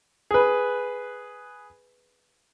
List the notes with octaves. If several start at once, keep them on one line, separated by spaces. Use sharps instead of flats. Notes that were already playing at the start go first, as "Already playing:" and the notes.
G#4 B4